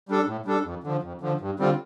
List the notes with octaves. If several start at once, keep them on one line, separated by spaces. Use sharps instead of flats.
G3 D4 A4
A2
G3 D4 A4
F2
D3 F3
F2
D3 F3
G2
D3 G3 C4 F4